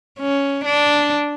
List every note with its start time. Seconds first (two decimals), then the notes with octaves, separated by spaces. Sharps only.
0.19 C#4
0.65 D4